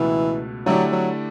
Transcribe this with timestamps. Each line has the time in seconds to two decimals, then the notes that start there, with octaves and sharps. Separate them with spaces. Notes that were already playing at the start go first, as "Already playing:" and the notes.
Already playing: C#2 B2 E3 A3
0.66 D3 F#3 A3 E4 G4 D5
0.92 F#3